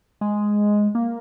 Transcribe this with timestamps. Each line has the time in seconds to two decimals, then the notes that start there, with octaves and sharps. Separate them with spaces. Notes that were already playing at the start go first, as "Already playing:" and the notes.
0.21 G#3
0.95 A#3